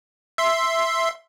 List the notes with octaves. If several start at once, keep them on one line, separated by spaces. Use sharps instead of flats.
E5 C6